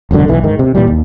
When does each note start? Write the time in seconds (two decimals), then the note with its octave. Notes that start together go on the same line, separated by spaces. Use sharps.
0.11 E1 C#2 F#2 D3
0.28 B1 E3
0.44 G#2 D#3
0.59 C3
0.75 A#2 E3 G3
0.87 D#2